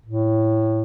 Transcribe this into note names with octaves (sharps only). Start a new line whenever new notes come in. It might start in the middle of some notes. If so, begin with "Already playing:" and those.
A2